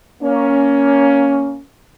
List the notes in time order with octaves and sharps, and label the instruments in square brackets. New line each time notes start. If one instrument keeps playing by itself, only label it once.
[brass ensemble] A#3 C#4